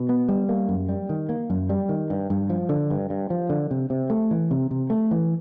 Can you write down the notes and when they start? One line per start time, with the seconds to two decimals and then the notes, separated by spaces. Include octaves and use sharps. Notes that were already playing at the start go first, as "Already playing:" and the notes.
Already playing: B2
0.09 B3
0.29 G3
0.49 A#3
0.69 F#2
0.89 G3
1.09 D#3
1.29 A#3
1.50 F#2
1.69 G3
1.89 D#3
2.10 G2
2.30 G2
2.50 F3
2.69 D3
2.90 G2
3.10 G2
3.30 F3
3.50 D3
3.71 C3
3.90 C3
4.10 A3
4.31 E3
4.51 C3
4.71 C3
4.90 A3
5.11 E3